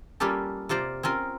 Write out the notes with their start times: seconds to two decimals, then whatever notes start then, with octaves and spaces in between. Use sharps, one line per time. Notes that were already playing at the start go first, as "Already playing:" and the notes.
0.20 G3 A#3 C#4 F4 G4 A4
0.69 C3 F4 C5 D5 A#5
1.03 C4 C#4 F4 A#4